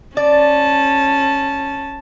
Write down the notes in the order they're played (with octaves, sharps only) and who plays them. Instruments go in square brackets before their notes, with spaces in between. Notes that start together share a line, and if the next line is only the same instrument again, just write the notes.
[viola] C#4 A5 [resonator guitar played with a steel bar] D5